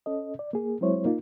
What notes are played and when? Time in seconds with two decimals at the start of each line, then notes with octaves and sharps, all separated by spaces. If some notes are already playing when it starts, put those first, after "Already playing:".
0.06 C#4 A4 D#5
0.39 D5
0.53 A#3 G#4
0.81 F#3 G#3 C4 E4 C5 C#5
1.05 A#3 D#4 F4